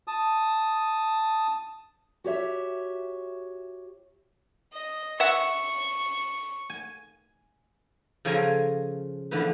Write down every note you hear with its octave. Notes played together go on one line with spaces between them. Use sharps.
A5 D#6
F#4 G4 C#5 E5
D#5
E5 F#5 C#6
G#5
C#3 F3 A4 C#5 G#5 A#5
D3 E3 F3 B3 B4